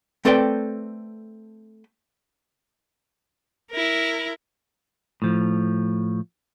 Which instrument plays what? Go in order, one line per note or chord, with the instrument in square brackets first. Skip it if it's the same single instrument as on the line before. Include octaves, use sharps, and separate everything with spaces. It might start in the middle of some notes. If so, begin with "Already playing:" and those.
[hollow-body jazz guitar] A3 C4 A4 B4 D5 G5
[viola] E4 A#4
[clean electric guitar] A2 F3